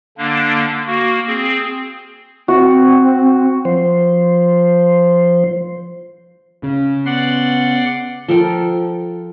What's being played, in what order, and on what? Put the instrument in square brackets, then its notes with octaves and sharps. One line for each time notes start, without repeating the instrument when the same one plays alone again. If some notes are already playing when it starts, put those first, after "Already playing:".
[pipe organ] D3 A#3 D4
A#3 F#4
C4 G#4
[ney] C4 [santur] F#4
[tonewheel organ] F3 C5
[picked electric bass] C#3
[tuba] B3 [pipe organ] D5 F#5 C6
[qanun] F3 A4 A#4 G5